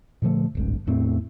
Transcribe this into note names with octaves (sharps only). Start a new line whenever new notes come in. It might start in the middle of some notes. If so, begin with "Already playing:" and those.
A#2 D3 F3 A3
D1 G#1 G2
E2 A2 A3 C4